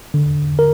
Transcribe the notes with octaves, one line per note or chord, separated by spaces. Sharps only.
D3
A#4